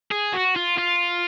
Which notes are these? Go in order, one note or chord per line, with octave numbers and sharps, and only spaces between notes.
G#4
F#4
F4
F4